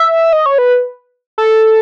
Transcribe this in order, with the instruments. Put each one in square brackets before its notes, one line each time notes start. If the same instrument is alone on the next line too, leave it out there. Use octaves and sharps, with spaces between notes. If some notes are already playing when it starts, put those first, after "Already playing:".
Already playing: [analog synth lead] E5
D#5
C#5
B4
A4